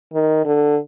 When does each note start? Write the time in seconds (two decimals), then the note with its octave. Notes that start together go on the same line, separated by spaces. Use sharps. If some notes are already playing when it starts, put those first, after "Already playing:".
0.13 D#3
0.45 D3